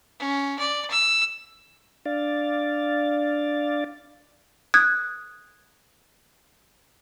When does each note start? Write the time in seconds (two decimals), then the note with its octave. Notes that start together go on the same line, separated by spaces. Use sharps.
0.20 C#4
0.59 D5
0.90 E6
2.06 D4 D5 F5 A6
4.74 D#6 F#6 G#6